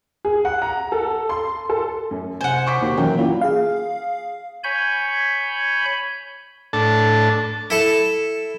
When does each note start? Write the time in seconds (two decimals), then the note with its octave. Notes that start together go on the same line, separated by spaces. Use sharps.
0.25 G#4
0.45 F#5
0.62 A#5
0.92 A4
1.29 C6
1.69 A4
2.11 F#2
2.41 C3 C5 F#5 G#5
2.67 C#6 D6 B6
2.81 D#2 B2
2.97 F#2 E3 G5
3.17 A#2 E4
3.41 G#4 F5
4.64 C#5 G#5 B5 G6
6.73 A2 D4 A4 A5
7.70 E4 A4 A5